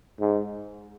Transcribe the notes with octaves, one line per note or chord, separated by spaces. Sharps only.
G#2